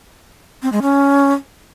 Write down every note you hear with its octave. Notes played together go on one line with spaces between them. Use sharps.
C4
G#3
C#4